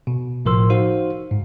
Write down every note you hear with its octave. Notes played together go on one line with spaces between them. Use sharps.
B2
G1 A2 F3 A#4 C6 E6
D#4 F#4 C5 F5
G#2